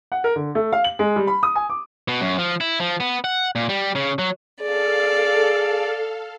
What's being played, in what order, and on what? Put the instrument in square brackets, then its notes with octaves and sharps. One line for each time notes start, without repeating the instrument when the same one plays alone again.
[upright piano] F#5
A#4
D3
A3
F5
F#7
G#3
G3
B5
D#6
G#5
D6
[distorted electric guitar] B2
F#2
F3
E4
F3
B3
F#5
A#2
G3
C#3
F#3
[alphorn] G#4 [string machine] A4 F5 [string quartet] D5